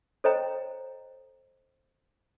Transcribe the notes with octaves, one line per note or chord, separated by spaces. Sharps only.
A4 C5 C#5 D#5 G5 A#5